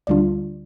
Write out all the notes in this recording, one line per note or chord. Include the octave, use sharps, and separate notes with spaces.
D2 D3 G3 D4 F4 D5